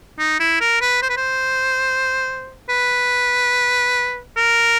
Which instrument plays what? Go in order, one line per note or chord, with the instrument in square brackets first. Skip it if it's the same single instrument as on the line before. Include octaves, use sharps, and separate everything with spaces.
[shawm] D#4
E4
A#4
B4
C5
B4
C5
B4
A#4